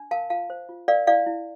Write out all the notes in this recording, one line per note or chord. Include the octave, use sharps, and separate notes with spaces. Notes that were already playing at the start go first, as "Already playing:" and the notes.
Already playing: D4
A#4 F5 A5
F4 F5 A5
C5
F4
A#4 D5 F5
E4 D5 F5
E4